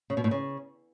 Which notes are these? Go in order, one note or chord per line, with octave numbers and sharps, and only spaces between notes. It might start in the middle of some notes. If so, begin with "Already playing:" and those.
C#3
B2
A2
C#3